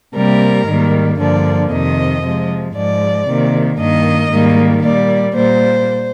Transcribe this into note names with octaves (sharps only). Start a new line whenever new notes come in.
C3 G3 A#3 A#4
G#2 D#3 G3 A#3
G2 D3 F3 A#3 D5
F2 C3 D#3 D#5
C3 F3 G#3
G#2 F3 G#3 D5
C3 D#3 A#3
G2 D#3 A#3 D#5
G#2 D#3 G3 A#3
A#2 G3 A#3 D5
A#2 G3 A#3 C5